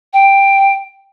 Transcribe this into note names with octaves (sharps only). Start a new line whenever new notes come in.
G5